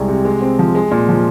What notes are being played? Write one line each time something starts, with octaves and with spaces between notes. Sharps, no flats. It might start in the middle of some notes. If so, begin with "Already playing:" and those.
Already playing: C2 G#3
C3
G#3
C4
F3
G#3
A#2
F3